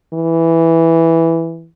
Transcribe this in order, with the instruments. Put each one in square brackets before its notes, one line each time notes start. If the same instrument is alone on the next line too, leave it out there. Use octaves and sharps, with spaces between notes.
[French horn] E3